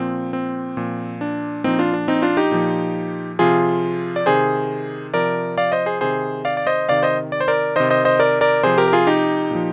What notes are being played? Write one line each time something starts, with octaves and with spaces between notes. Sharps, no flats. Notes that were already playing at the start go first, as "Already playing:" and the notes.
Already playing: A#2 F3 C4
C4
A#2 F3
D4
A#2 F3 C4 D#4
D4 F4
D4
C4 D#4
D4 F4
D#4 G4
A#2 F3
C3 F3 F4 G#4
D5
C3 D#3 G#4 C5
C3 F3 A#4 D5
D5 F5
C5 D#5
G#4 C5
C3 D#3 G#4 C5
D5 F5
D5
C5 D#5
C3 D#3 D5 F5
C5 D#5
D5
C5
A#4 D5
C3 D#3 C5 D#5
C5 D#5
C5 D#5
A#4 D5
A#4 D5
C3 F3 G#4 C5
G4 A#4
A#4
F4 G#4
D#4 G4
A#2 F3